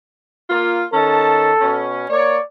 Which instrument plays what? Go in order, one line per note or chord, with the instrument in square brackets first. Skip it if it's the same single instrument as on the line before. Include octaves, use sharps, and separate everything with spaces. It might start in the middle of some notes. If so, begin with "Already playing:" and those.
[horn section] A#3 F4
[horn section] D#3 C#4 A5 [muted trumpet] A4
[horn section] B2 C#4
[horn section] A#3 C#5 [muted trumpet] D5